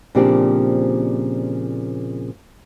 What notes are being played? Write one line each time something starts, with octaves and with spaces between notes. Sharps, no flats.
A#2 C#3 F3 C4 D4 G4